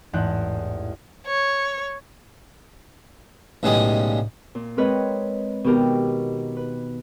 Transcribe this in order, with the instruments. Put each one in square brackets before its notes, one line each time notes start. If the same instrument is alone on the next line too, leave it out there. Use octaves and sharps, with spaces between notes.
[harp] A1 E2 G#2 F#6 G6
[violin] C#5
[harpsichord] B1 A2 C#3 G3 G#3 D#5
[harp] A#2
G#3 C4 A#4 B4 C#5 D#5
B2 D#3 B3 G4 A#4
B4